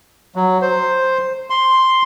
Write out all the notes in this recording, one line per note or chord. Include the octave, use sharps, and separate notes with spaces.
F#3
C5
C6